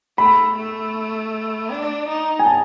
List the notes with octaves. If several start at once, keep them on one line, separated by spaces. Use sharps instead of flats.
A3 B5
A3
D4
D#4
G#5
A5